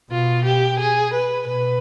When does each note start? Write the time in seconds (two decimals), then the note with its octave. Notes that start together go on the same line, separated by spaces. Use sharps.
0.11 B2 F4
0.45 G4
0.79 G#4
1.13 B4
1.46 B2 B4